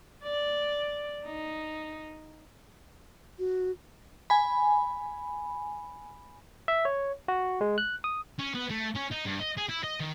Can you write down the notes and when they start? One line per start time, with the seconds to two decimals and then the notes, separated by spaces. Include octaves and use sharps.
0.23 D5
1.25 D#4
3.39 F#4
4.30 G#5 B5
6.68 E5
6.85 C#5
7.28 F#4
7.61 G#3
7.78 F#6
8.04 D#6
8.39 C#4
8.55 B3
8.70 A3
8.96 C#4
9.12 D#4
9.26 G2
9.40 D#5
9.57 G#4
9.69 E4
9.84 D#5
10.00 D#3